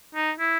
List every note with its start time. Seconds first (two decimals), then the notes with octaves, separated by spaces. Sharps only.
0.15 D#4
0.39 E4